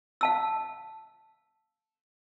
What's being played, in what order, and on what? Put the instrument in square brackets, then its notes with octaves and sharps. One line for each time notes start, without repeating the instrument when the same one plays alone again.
[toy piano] F5 A5 E6